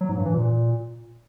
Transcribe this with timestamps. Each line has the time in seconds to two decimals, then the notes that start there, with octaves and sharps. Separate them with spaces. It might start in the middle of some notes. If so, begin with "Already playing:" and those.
0.01 F#3
0.09 G#2
0.17 G2
0.25 E3
0.34 A#2